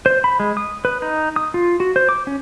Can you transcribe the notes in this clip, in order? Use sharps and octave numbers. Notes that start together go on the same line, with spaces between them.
C5
B5
G#3
D#6
B4
D#4
D#6
F4
F#4
C5
D6
C#4